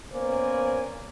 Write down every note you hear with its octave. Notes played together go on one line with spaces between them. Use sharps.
A#3 B3 C#4 C5 D5 G#5